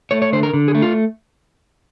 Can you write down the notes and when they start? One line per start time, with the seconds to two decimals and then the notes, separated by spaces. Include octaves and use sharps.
0.11 A3 C#5
0.22 C#5
0.33 D3 C5
0.43 A#4
0.54 D3
0.68 G#4
0.75 A3
0.82 F4